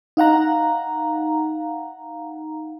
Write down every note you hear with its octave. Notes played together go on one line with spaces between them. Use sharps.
D#4 F5 F#5 A#5